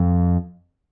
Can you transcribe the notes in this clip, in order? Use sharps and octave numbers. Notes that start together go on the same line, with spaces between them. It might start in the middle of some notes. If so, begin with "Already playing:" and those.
Already playing: F2